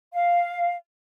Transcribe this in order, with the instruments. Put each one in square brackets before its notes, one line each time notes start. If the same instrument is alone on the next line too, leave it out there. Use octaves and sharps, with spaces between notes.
[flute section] F5